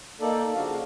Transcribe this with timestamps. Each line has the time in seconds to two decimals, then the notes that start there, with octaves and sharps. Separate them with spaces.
0.21 A#3 D#4 A4 D5
0.55 C#3 F3 D4 F#4 F5